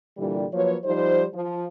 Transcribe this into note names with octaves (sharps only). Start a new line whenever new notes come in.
A#2 D3 E3 G3
F3 F#3 A#3 B4 C#5
F3 G3 D#4 C5
F3